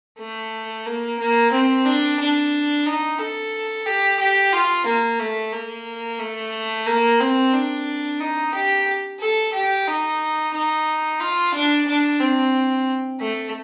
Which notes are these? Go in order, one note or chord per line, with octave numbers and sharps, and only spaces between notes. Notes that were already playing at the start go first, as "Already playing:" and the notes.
A3
A#3
A#3
C4
D4
D4
D#4
A4
G4
G4
F4
A#3
A3
A#3
A3
A#3
C4
D4
D#4
G4
A4
G4
D#4
D#4
F4
D4
D4
C4
A3